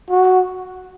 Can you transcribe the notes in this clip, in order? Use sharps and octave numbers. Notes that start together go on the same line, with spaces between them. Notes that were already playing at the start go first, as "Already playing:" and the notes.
F#4